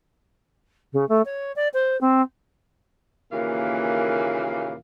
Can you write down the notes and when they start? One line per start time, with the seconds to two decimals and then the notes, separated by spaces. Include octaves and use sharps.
0.93 C#3
1.09 A3
1.25 C#5
1.56 D5
1.73 C5
2.01 C4
3.32 D#2 A#2 C#3 E3 A#3 F5